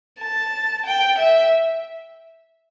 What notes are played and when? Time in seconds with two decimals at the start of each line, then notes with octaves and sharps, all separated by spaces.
0.20 A5
0.86 G5
1.19 E5